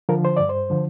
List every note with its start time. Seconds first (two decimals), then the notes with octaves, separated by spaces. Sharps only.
0.09 D3 F3 A#4
0.25 C5
0.37 G2 D5
0.49 C5
0.70 D3 F3